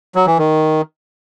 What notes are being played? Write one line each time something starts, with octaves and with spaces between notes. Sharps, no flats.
F#3
E3
D#3